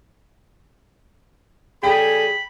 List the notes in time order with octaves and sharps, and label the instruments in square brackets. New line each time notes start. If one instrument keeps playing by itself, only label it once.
[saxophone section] C#3 G3 G#4 [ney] A4 [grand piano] G5 [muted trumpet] B5